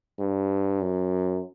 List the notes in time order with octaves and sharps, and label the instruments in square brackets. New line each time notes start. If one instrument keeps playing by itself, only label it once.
[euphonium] G2
F#2